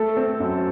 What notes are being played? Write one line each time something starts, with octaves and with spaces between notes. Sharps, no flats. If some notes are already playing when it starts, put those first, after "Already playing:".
Already playing: A3 A4
C4
F#2